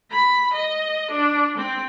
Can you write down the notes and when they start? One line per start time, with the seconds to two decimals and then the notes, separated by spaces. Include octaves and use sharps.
0.11 B5
0.53 D#5
1.10 D4
1.57 C4